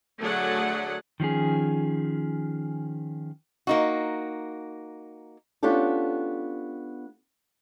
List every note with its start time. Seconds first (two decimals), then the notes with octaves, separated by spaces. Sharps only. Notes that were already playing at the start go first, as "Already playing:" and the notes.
0.19 D3 F#3 A3 G#4 D5 F#5
1.20 D#3 F3 C#4 G#4
3.67 A#3 D#4 F#4
5.63 B3 C#4 D4 F4 G4 A4